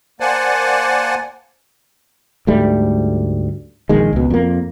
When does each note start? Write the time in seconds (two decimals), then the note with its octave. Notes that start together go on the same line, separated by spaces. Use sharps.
0.20 A#3 C5 D5 F#5 G#5 A5
2.47 D2 G#2 G3 A3
3.89 A#1 D#3 G#3
4.13 C#2 B2
4.30 F2 A#3